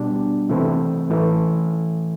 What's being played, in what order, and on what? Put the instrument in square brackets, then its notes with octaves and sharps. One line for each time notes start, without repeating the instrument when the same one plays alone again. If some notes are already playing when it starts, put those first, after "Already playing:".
Already playing: [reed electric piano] B2 G3 D4
C3 E3 A3 C4 E4
A2 E3 A3 E4